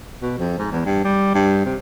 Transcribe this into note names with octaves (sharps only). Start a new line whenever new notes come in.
B2
F2
G#2
E2
G2
G3
G2
C3